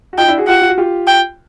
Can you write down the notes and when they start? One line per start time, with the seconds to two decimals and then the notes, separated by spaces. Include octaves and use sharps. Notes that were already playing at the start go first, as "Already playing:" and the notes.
0.13 F#4
0.18 D#4 F4 G5
0.28 D4 E4
0.38 F#4 G#4
0.48 F4 G4 F#5
0.62 F4
0.70 F#4
0.78 F4 G4
1.07 G5